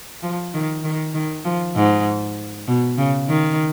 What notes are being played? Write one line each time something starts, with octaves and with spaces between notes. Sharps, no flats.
F3
D#3
D#3
D#3
F3
G#2
B2
C#3
D#3